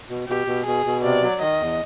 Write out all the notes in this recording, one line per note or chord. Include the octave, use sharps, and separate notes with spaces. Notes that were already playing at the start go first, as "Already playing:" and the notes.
B2
B2 G4
B2
B2 G#4
B2
C3 D5
F#3
D#3 D#5
E2